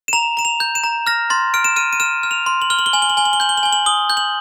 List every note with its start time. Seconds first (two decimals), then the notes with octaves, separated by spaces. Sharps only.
0.08 E7
0.13 A#5 F7
0.37 A#5 E7
0.45 F7
0.60 G6
0.75 E7
0.84 A#5
1.07 F6 A#6
1.30 C6 A6
1.54 F6 D7
1.64 E7
1.76 F6 D#7
1.93 D#7
2.00 F6 E7
2.23 F6
2.31 F7
2.46 C6
2.62 F#7
2.70 F6 G7
2.79 F#7
2.86 G7
2.93 G#5 F#7
3.02 G7
3.10 F#7
3.17 G#5 G7
3.25 F#7
3.33 G7
3.40 G6 F#7
3.49 G7
3.57 F#7
3.63 G#5 G7
3.73 F#7
3.86 D#6 G7
4.10 G6
4.17 F#7